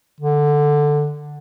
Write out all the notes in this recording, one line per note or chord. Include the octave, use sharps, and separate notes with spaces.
D3